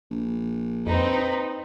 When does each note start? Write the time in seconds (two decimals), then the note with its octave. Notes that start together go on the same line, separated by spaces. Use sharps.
0.11 A#1
0.87 F2 C4 D#4 B4